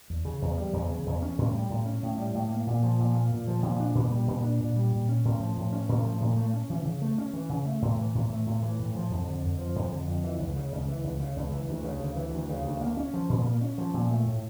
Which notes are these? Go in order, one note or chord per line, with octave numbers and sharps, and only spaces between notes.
E2
C#3
E2
G3
E2
C#3
E2
C#4
A2
G3
A2
C#4
A2
G3
A2
A#3
A#2
F3
A#2
A#3
A#2
F3
A#2
D4
A#2
G3
A#2
D4
A#2
G3
A#2
C#4
A2
F3
A2
C#4
A2
F3
A2
A3
C#4
E3
C#3
A3
C#4
E3
C#3
A3
A2
E3
A2
A3
A2
E3
A2
F3
F2
D3
F2
F3
F2
D3
F2
E3
C#2
C#3
C#2
E3
C#2
C#3
C#2
E3
D2
C#3
D2
E3
D2
C#3
D2
A#3
C#4
F3
A#2
A#3
C#4
F3
A#2
A3
A2